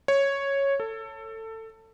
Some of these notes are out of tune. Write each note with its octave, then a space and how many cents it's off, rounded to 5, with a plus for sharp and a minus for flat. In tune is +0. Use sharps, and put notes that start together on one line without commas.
C#5 -5
A4 +20